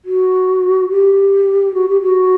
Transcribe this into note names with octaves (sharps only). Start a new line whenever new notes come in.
F#4
G4
F#4
G4
F#4